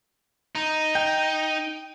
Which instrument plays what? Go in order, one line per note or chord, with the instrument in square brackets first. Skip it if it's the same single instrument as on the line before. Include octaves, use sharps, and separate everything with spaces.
[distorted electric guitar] D#4
[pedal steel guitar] G5